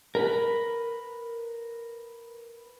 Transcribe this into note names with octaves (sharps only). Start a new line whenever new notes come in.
A#4 B4